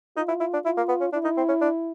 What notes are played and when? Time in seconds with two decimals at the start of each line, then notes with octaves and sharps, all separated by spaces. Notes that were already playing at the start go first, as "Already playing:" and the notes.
0.17 D#4 F4
0.28 E4
0.40 E4
0.53 D4
0.65 E4 F4
0.77 A#3
0.89 B3
1.01 C#4
1.13 D4 E4
1.24 D#4
1.37 C4
1.48 C#4
1.61 D4